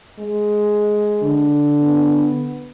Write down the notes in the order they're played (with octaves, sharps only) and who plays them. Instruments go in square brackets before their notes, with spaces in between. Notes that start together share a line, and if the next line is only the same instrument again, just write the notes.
[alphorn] G#3
[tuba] D3
[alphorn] B3